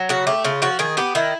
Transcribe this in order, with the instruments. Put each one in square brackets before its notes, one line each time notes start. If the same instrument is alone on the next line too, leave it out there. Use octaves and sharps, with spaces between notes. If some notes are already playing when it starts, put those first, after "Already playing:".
Already playing: [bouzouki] F#3
C#3 F#4
A3 G4
C#3 F4
F3 F#4
D#3 G#4
B3 G4
D#3 E4